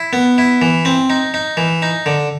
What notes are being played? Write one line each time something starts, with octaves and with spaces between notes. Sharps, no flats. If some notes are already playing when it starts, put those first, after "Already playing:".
Already playing: E4
B3
E4
E3
C4
D#4
D#4
E3
D#4
D3